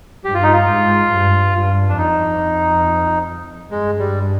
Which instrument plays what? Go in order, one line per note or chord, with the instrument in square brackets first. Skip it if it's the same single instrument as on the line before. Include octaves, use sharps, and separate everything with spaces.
[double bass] G2 [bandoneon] G4
[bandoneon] F4
D#4
F4
[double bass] G#2
G2
G2
[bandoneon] D4
[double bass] F2 [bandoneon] D#4
[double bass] G2 [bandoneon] G#3
[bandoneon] G3